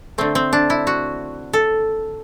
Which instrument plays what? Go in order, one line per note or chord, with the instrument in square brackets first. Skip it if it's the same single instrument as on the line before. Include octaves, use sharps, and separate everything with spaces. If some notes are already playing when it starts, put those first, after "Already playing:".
[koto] D3 A3 C4
C4
D4
E4
F#4
A4